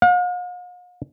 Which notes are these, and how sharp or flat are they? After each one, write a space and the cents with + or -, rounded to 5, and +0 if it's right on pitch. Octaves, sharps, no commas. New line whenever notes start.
F5 +45